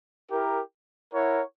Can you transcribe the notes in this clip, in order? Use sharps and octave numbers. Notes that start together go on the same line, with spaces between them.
E4 G4 A#4
E4 A#4 C#5 F#5